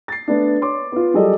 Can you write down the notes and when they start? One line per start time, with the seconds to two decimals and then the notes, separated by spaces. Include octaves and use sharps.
0.08 A6 C7
0.28 A3 B3 D4
0.61 C#5 C6 D6
0.92 B3 F4
1.14 F#3 G3 G#4 A4 D5 D#5